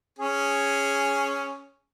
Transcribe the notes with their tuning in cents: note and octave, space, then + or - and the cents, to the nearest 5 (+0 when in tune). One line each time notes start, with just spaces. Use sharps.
C#4 +0 G#4 +0